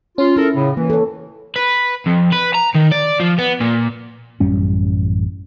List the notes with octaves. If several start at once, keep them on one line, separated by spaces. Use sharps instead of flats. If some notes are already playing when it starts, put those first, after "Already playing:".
C#4 F4
E4 A4 A#4
A2 C#3
E3 A#3
A4 C#5
B4
F2
B4
A#5
D#3
D5
F3
B3
A#2
A1 F#2 G3 C#4